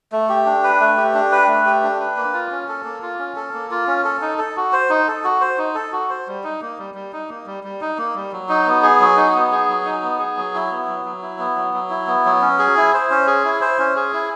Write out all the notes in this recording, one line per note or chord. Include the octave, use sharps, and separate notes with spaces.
A3
G4
D4
B4
A3
G4
D4
B4
A3
G4
D4
B4
A#3
F4
C#4
A4
A#3
F4
C#4
A4
A#3
F4
C#4
A4
D#4
A4
F#4
C5
D#4
A4
F#4
C5
D#4
A4
F#4
C5
G3
D#4
A#3
G3
G3
D#4
A#3
G3
G3
D#4
A#3
G3
F#3
D#4
B3
G#4
F#3
D#4
B3
G#4
F#3
D#4
B3
G#4
F#3
E4
B3
F#3
F#3
E4
B3
F#3
F#3
E4
B3
F#3
C#4
G#4
E4
C5
C#4
G#4
E4
C5
C#4
G#4
E4